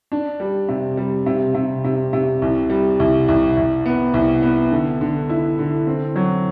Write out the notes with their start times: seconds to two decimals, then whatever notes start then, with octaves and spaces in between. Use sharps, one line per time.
0.12 D4
0.40 G3
0.69 C3
0.97 G3
1.26 C3
1.54 C3
1.84 C3
2.13 C3
2.42 C2
2.70 G3
3.00 C2
3.28 C2
3.57 C2
3.86 B3
4.14 C2
4.42 B3
4.71 D3
5.01 D3
5.29 E4
5.59 D3
5.87 C4
6.16 F#3